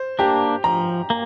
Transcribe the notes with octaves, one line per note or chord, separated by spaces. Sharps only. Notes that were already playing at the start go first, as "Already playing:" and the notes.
Already playing: C5
A#3 D4 G4
F3 A#5
A#3